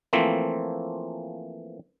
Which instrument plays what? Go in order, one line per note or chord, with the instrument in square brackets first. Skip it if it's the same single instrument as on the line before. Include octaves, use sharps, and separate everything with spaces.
[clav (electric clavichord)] E3 F3 A3 A#3 C4